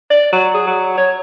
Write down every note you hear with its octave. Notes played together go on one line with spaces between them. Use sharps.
D5
F#3
G#4
F#3
C#5